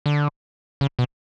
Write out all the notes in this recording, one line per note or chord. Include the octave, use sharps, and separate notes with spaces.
D3
C#3
B2